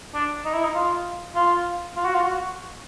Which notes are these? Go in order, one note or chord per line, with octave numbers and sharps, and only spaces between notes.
D4
D#4
E4
D#4
F4
F4
F4
F#4
F4
F#4